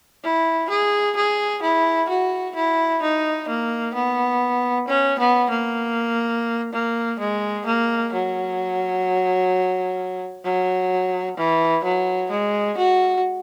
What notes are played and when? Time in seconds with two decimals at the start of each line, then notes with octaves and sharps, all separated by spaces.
0.24 E4
0.70 G#4
1.16 G#4
1.62 E4
2.09 F#4
2.56 E4
3.02 D#4
3.48 A#3
3.95 B3
4.88 C#4
5.19 B3
5.50 A#3
6.73 A#3
7.19 G#3
7.66 A#3
8.13 F#3
10.45 F#3
11.37 E3
11.84 F#3
12.31 G#3
12.78 F#4